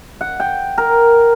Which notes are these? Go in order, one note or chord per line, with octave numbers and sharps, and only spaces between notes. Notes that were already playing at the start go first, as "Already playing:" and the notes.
F#5
G5
A#4